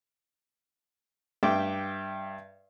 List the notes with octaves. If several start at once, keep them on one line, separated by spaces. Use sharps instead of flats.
G2 E5 G5 D6